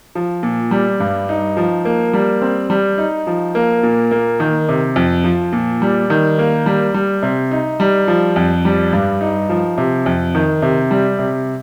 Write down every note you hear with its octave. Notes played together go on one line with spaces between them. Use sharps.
F3
A#2
G3
G2
D#4
F3
A#3
G3
C4
G3
D#4
F3
A#3
A#2
A#3
D#3
C3
F2
F3
A#2
G3
D#3
A#3
G3
G3
C3
D#4
G3
F3
F2
G3
G2
D#4
F3
C3
F2
D#3
C3
G3
C3